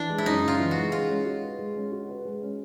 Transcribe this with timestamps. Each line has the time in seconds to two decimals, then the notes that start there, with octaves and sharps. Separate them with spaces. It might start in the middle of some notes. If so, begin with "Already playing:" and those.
Already playing: E3 D4
0.10 G#3
0.18 E4
0.26 F#2 D#4
0.42 C#3
0.48 F4
0.59 E3
0.71 G#3 F#4
0.92 G#3 F4
1.09 C#4
1.26 F#4
1.42 B4
1.59 G#3
1.76 C#4
1.92 F#4
2.09 B4
2.25 G#3
2.42 C#4